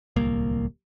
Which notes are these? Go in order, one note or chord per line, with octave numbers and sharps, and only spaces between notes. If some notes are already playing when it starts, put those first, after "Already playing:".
D1 C2 A#3